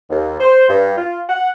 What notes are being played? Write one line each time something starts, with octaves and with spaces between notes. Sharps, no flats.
D#2
C5
G2
F4
F#5